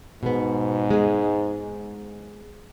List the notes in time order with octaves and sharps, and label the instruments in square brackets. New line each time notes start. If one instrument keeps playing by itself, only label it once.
[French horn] G#2 [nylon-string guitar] B2 B3
[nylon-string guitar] G#3 G#4